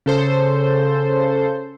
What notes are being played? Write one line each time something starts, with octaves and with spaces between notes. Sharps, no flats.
C#3 A4 C5